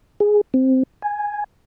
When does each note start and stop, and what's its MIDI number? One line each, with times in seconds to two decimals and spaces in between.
0.20 0.41 68
0.54 0.83 60
1.02 1.44 80